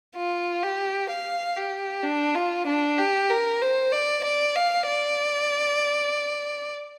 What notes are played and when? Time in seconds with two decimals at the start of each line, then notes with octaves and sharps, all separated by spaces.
0.16 F4
0.63 G4
1.10 F5
1.57 G4
2.04 D4
2.35 F4
2.67 D4
2.98 G4
3.30 A#4
3.62 C5
3.92 D5
4.24 D5
4.56 F5
4.87 D5